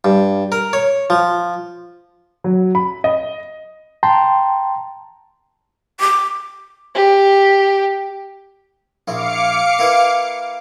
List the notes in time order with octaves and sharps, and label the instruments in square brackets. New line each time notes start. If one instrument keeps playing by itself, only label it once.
[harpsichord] G2
A#4
C#5
F3
[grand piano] F#3
B5
D#5
[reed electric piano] G5 A5 A#5 C6
[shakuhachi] D6
[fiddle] G4
[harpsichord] A#1 E4 [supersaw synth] F5 D6 C#7
[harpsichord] A#3 E4 B4